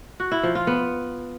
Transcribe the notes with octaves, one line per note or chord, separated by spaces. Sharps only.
F#4
E4
F3
F4
B3